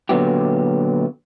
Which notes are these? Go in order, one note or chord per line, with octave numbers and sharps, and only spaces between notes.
A#2 D3 F#3 B3 G4